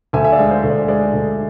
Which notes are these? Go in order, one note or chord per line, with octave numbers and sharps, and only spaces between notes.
D2 E5 G#5
E5
D5 F5
G#3
C5 E5
D2
D5
G#3 D5
D2